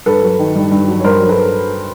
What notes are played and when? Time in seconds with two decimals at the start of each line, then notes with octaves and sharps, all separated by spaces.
0.06 G2 A4 B4
0.22 F#3
0.39 D#3
0.55 G2
0.71 G2
0.88 F#3
1.00 C#5
1.04 G2 A#4 C5
1.21 F#3
1.29 A4 B4